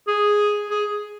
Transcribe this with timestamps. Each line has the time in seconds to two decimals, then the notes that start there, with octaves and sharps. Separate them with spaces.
0.08 G#4
0.70 G#4